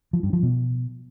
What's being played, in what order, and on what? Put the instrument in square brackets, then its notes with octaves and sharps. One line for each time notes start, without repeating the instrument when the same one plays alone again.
[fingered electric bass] F3
G2
F3
B2